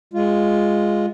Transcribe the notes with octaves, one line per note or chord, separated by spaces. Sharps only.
G#3 F4